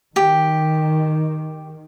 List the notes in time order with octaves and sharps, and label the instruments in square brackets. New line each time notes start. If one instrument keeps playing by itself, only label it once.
[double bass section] D#3 [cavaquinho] G4